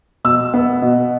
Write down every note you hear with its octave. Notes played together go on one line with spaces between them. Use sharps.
B2 E6
B3
B2